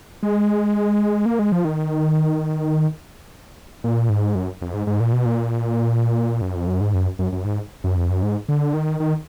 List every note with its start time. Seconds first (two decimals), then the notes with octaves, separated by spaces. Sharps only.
0.23 G#3
1.26 A#3
1.39 G#3
1.52 F3
1.65 D#3
3.84 A#2
4.09 G#2
4.35 F#2
4.62 F2
4.74 G#2
4.87 G#2
5.00 A#2
5.13 B2
5.26 A#2
6.42 F#2
6.55 F2
6.67 F#2
6.81 G#2
6.94 F#2
7.19 F#2
7.32 F#2
7.45 G#2
7.84 F#2
7.97 F2
8.10 F#2
8.23 G#2
8.49 D3
8.74 D#3
9.00 D#3